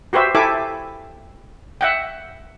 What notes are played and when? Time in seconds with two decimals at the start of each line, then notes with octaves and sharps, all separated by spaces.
0.13 F#4 G4 B4 C5 E5
0.35 E4 G4 A4 E5 G#5 D6
1.81 E5 F#5 G5